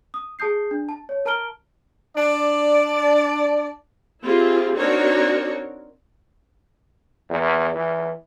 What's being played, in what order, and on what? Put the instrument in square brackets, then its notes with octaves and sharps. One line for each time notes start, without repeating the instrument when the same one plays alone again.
[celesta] D#6
G#4 A5 D#6 G6 C7
D4
A5
C#5
A#4 A5 A#5 F6 D7 G7
[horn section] D4 D5
[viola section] C4 E4 F4 G4 G#4
C4 D4 D#4 F#4 A#4 C#5
[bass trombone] E2
E3